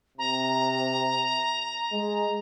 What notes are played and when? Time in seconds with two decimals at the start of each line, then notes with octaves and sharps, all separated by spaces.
0.18 C3 A#5
1.92 G#3